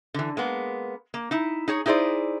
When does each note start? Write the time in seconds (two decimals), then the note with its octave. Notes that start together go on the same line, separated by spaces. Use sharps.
0.14 D3 E3
0.37 G#3 A#3 B3
1.14 A#3
1.31 D#4 E4
1.68 D#4 G#4 C#5
1.86 D#4 E4 G#4 C5 D5